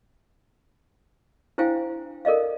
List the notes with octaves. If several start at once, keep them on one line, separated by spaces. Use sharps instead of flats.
D4 E4 C5 F5 G5 G#5
A4 A#4 D5 D#5 F5